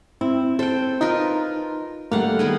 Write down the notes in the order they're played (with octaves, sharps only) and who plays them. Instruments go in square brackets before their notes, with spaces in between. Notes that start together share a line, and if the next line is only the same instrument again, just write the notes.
[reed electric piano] C4 [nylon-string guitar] E4
[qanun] A4 G5 [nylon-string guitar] C5
[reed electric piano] D#4 [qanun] F4 A#4 B4
[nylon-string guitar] D3 A3 [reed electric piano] G3 A#3 [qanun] F5 F#5
[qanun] D#3 B3 G#4